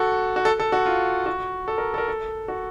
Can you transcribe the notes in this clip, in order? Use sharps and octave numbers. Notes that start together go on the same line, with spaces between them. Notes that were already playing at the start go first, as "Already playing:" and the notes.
Already playing: F#4 A4
F#4
A4
A4
F#4
F4
F#4
A4
A#4
A4
A#4
A4
F#4